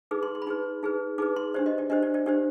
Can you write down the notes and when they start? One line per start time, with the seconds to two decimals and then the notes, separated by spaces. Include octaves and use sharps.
0.11 D#4 G#4 B4 D6
0.23 C6
0.35 C6
0.42 B5
0.47 D#4 G#4 B4 C6
0.83 D#4 G#4 B4
1.18 D#4 G#4 B4 D6
1.36 C6
1.54 D4 G4 C5 D5
1.66 D#5
1.78 D5
1.90 D4 G4 C5 D#5
2.03 D5
2.14 D5
2.26 D4 G4 C5 D5